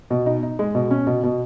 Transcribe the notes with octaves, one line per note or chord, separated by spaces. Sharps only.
B2
D#4
D#4
G#3
B2
C#4
B2
B2